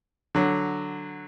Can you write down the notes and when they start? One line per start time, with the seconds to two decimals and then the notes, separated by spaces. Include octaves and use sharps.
0.35 D3 F#3